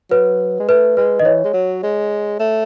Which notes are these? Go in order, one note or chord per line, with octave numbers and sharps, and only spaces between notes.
F#3 B4
G#3
A3 B4
G#3 B4
D#3 D#5
E3 C#5
G#3
F#3
G#3
A3